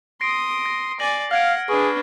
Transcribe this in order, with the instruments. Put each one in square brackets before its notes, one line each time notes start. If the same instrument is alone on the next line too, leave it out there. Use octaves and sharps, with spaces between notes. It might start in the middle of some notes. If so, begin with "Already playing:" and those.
[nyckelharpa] C6 D#6 [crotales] A#6 C7 D7
[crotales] A#6
[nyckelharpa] D5 G#5 [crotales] A#6 F#7
[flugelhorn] F5 [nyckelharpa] F#5 [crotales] F6 G#6 D7
[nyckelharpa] D4 B4 [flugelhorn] G#4 [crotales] C#6 C7